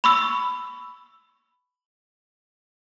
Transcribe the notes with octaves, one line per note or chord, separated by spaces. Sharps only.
B5 C#6 E6